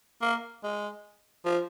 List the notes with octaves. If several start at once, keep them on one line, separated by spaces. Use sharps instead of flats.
A#3
G#3
F3